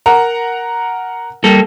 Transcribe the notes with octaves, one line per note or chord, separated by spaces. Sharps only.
A#4 F#5 A#5
G3 A#3 A4